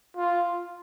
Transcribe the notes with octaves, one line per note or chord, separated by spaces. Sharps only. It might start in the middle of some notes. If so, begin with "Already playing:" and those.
F4